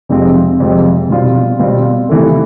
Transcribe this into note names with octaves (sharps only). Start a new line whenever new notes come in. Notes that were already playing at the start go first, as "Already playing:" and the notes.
F2 C3 F3 G#3 C4
F2 C3 F3 G#3 C4
B2 G3 C4 F4
B2 G3 C4 F4
C3 E3 A3